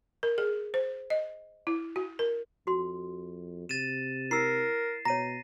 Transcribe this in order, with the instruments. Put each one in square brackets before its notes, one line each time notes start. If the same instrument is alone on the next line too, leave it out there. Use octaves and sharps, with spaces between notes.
[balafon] A#4
G#4
C5
D#5
E4
F#4
A#4
[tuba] F2 [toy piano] F#4 C6
[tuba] C3 [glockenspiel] A6 D#7 E7
[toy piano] E4 E6 [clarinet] A#4 [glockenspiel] C7
[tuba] B2 [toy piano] C#5 A#5 [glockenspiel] A#6 D#7